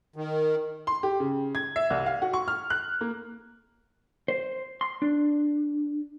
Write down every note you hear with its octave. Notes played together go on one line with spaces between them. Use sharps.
D#3
C6
G4
C#3
G#6
E5
C2
F5
F#4
C#6
F6
F#6
A#3
C5
C6
D4